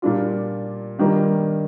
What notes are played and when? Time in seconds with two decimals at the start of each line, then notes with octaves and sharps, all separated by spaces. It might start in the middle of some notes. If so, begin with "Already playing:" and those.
0.02 A#2 G3 D4 F4
0.99 G2 D#3 G3 A#3